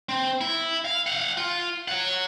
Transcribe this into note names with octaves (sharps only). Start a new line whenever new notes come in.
C4
E4
F5
F5 F#5
F4
C#5 F#5